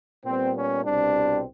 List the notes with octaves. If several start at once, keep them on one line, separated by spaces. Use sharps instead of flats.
A#2 G3 B3 C4
C#4
C2 B2 G3 C4 D4